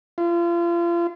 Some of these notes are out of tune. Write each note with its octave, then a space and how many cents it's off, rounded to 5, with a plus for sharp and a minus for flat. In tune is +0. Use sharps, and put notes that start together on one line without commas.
F4 -35